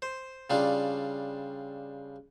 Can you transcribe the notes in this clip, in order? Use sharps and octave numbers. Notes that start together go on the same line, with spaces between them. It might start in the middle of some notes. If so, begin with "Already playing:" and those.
C5
C#3 G3 D4 F4